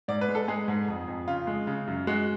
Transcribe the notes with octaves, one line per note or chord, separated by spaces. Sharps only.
G#2 D5
B4
G#3
A4
G#3 G#4
G#2
F2
F2
C#3 F4
G#3
C#3
F#2
G#3 F#4